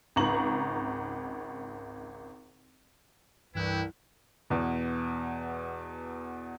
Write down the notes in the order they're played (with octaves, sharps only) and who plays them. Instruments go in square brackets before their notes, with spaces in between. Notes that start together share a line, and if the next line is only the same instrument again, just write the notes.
[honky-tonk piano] G#1 C#2 A#5 C#6 F#7
[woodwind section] C2 [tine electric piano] G2 E3 F#6 [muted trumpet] E4 [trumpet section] B4 G5
[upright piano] E2 B2